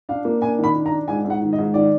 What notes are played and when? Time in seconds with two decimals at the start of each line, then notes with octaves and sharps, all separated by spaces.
0.09 D4 F5
0.25 A#3
0.42 D4 G#5
0.59 D#3 B5
0.75 D4
0.86 A#5
0.92 D4
1.08 G#2 G#5
1.24 G#2
1.30 F#5
1.42 D#3
1.53 D#5
1.58 G#2
1.74 D#3 D5